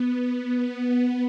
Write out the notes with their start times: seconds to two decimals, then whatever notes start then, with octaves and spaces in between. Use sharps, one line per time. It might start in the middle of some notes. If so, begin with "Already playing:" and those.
Already playing: B3
0.21 B3
0.63 B3